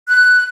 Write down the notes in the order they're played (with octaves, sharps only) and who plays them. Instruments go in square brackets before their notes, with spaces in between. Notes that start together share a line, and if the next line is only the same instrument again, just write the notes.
[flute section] F#6